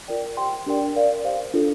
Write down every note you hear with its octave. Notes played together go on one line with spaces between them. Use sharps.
F4 A#4 D5 G5
G4 C5 G5 C6
D4 G4 A#4 D5 G5
A#4 D5 F5
G4 C5 F5
D4 F4 A4